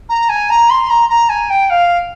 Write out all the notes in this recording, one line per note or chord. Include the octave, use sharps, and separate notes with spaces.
A#5
G#5
A#5
C6
A#5
A#5
G#5
G5
F5